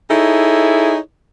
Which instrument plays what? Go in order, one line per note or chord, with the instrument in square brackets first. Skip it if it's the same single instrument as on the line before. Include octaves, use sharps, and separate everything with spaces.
[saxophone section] D#4 E4 G#4 A4 C#5